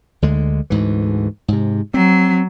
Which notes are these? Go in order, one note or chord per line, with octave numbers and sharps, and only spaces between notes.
D2 D3 G#3
D2 G#2 E3
G#2 C3
F#3 C4